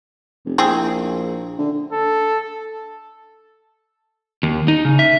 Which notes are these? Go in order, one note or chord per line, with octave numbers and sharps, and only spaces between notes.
F1
A#1 C4 E4 G#4
D3
A4
D#2
D#4
C#3
E5